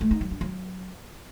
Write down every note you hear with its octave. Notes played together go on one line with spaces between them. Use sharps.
A3
D#4
F#3
D4
F#3